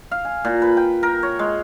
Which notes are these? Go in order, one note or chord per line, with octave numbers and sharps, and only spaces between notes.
F5
G#5
A#2
B4
G5
A#4
C#5
G#3